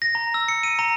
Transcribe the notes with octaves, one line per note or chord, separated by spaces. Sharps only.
A#6
A#5
E6
C#7
D#7
A#5